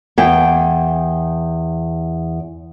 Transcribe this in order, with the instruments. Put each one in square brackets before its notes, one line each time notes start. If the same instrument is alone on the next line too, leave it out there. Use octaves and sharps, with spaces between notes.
[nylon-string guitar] E2 G5